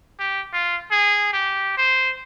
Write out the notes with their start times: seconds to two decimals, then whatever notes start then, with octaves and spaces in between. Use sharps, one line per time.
0.19 G4
0.53 F4
0.91 G#4
1.33 G4
1.78 C5